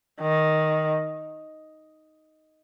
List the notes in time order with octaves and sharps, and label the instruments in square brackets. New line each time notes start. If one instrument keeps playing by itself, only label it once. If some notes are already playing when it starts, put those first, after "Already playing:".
[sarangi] D#3